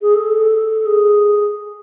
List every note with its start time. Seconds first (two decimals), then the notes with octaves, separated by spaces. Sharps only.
0.02 G#4
0.15 A4
0.86 G#4